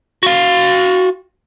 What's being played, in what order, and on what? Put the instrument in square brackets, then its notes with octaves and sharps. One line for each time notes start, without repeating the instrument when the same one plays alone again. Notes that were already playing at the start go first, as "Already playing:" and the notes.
[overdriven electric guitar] F#4 F5